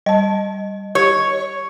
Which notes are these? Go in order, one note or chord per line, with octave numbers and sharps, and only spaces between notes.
G3 D#5 A5
G4 C#5